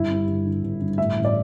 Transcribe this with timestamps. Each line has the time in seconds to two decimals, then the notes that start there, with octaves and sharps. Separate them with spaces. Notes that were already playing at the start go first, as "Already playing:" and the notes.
Already playing: G1 E4
0.10 G2
0.28 G1
0.45 D3
0.63 G1
0.81 G1
0.98 A2 E5
1.16 A1
1.25 D5